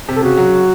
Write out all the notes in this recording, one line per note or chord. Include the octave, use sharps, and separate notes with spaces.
C3
A4
C#3 F#4
F#3